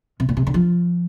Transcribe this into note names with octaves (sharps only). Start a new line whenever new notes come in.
C3
A#2
C3
D3
F3